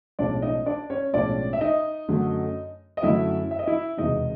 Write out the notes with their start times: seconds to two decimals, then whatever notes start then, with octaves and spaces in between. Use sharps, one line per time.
0.19 B1 A2 F3 G#3 C#4 D4 D5
0.42 D#4 D#5
0.66 D4 D5
0.90 C#4 C#5
1.13 B1 A2 F3 G#3 C#4 D4 D5
1.53 E5
1.61 D#4 D#5
2.08 F#2 D3 F#3 A3
2.97 D#5
3.03 F#2 D3 F#3 A3 E4 E5
3.51 E5
3.59 D#5
3.67 E4 E5
3.98 F1 E2 B2 G#3 D#4 D#5